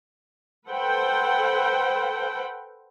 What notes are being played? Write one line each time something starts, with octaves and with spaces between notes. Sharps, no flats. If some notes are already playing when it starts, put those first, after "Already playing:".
A4 B4 C5 F#5 G5